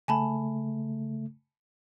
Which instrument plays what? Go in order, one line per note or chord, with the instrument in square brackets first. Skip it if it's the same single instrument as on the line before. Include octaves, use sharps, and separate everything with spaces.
[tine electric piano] C#3 A3 [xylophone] G#5 A5 B5